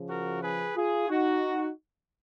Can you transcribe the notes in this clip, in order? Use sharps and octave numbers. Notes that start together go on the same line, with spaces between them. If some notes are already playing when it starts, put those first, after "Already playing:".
Already playing: C#3 F3
F#4 A#4
G#4 B4
F4 G#4
D#4 F#4